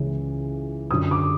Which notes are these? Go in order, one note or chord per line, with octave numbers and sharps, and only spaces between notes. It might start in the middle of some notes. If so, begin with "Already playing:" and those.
Already playing: C#2 C#3 E3
F#2 D3 D#6
D6